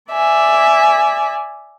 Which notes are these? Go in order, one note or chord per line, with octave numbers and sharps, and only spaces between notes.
D5 E5 G#5